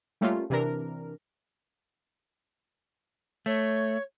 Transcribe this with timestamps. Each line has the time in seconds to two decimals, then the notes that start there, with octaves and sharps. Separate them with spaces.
0.21 G3 A3 A#3 C#4 F4
0.50 C3 E3 D4 A#4
3.46 A3 C#5